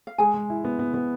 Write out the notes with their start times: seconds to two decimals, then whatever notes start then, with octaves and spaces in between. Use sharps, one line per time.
0.07 F5
0.18 G#3 G#4 G#5
0.34 G#3
0.50 E4
0.64 B3
0.79 B3
0.94 B3